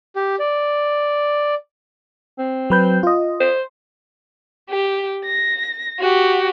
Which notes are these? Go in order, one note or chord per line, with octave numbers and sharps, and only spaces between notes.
G4
D5
C4
F#3 B4 G6
F4 D#5
C5
G4
A#6
F#4 G4